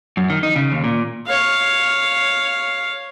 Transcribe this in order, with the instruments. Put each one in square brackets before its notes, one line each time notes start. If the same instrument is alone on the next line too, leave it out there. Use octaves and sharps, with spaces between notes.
[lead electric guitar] F#2
D#3
D#4
C#3
D#2
A#2
[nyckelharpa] C#5 F5